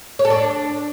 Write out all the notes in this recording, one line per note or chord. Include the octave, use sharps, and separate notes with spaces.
C#5
A4
D4